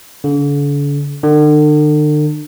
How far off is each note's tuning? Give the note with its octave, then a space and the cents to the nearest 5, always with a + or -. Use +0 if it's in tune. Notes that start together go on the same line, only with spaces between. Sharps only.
D3 -45
D3 +40